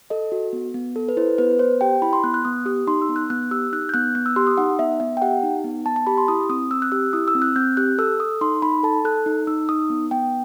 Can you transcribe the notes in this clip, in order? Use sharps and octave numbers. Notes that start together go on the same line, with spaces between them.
A4 D#5
F#4
B3
B3
A4
B4
E4 C5
B3 B4
B3 C5
G4 G5
E4 B5
C6
B3 F#6
F#6
B3 D#6
G4 D#6
D#4 C6
E6
B3
F#6
B3 F#6
G4 E6
D#4 F#6
G6
B3 F#6
B3 F#6
E6
G4 C6
D#6
D#4 F#5
B3 E5
B3 E5
G5
G4 F#5
D#4
B3
B3 A5
A5
G4 B5
C6
E4 D#6
C4 D#6
C4 E6
F#6
G4 E6
E4 D#6
E6
C4
F#6
C4 G6
G4 F#6
A4 E6
A4 D#6
D#4 C6
D#4 B5
A4 A5
A4 F#6
D#4
D#4 E6
D#4 D#6
B3
B3 G5